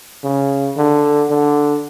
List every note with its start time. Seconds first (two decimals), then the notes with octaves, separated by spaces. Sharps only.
0.24 C#3
0.77 D3
1.30 D3